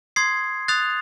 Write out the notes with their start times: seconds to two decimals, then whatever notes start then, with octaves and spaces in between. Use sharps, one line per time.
0.16 C6 D#6 G#6 C7
0.68 D#6 F#6 A6 C7 F7